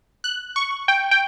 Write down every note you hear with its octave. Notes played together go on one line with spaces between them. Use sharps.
F#6
C#6
G5
G5